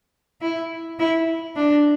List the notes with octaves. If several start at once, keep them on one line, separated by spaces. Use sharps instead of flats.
E4
E4
D4